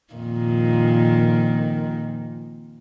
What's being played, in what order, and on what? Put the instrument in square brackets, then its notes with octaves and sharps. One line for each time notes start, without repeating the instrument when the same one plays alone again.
[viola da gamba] F2 A#2 D#3